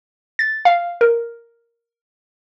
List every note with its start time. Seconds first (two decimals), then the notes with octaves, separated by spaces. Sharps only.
0.39 A6
0.65 F5
1.01 A#4